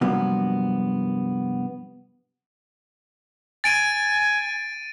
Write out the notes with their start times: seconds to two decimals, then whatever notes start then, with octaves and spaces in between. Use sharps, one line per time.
0.01 G2 C3 F3 F#3 A#3 B3
3.64 G#5 A6 D7 D#7